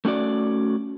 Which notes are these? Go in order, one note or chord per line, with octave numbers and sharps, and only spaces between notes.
A3 C#4 F#4 D5